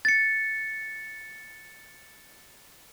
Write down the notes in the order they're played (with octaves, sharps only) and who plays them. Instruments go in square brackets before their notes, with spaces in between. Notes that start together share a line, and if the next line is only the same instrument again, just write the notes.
[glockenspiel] A6 C#7